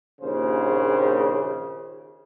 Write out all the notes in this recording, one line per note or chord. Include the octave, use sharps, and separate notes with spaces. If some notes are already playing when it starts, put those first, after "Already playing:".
A#1 D#2 C#3 C5